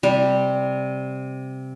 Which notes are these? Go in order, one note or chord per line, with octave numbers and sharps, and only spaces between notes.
C3 G3